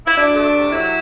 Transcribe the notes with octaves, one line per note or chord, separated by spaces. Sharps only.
E4
D2 D4
A3
C3
F#3 E4